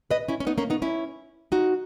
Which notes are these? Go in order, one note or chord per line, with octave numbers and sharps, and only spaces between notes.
B4 D#5
C#4 E4
C#4
B3 D#4
A#3 C#4
B3 D#4
C#4 E4
D#4 F#4